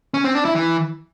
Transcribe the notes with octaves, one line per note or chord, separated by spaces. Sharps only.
C#4
C4
D4
E4
E3